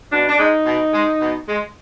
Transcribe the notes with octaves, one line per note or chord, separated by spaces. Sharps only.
B2 D4
D4
G#3 D#4
B2
G#3
B2
G#3